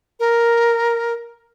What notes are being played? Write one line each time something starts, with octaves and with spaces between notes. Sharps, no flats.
A#4